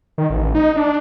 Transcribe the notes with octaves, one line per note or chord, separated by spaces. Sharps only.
D#3
A1
D#4
D4